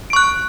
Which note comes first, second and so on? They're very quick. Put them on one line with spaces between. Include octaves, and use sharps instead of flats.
D7 C#6 F#6